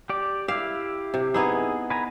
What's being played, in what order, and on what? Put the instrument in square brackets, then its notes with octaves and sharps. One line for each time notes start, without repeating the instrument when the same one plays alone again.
[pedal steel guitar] G4 D5
[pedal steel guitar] E4 G4 [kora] F5
[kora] C3
[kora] B3 D#4 E4 [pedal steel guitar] G#4
[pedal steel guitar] B4 G#5 A#5